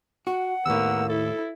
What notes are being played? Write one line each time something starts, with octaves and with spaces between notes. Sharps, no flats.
F#4 F#5
D#2 A2 A#3 B3 E6
E4 A4